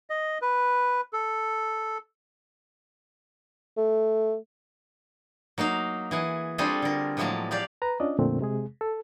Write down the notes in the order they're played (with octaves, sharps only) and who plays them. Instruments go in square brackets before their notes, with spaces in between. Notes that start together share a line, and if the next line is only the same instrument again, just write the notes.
[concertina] D#5
B4
A4
[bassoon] A3
[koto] F#3 A#3 D#4 F5
E3 G#4 F#5
G3 C4 D4 F4 G#4 A4
D3 A#4
A2 F3 F#3 G#3 A#3 A5
A#3 G4 D5 F5
[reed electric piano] B4 A#5
C#4 D4 F4 D5 D#5
F2 A#2 D3 A3 C4
C3 G#3 G#4
A4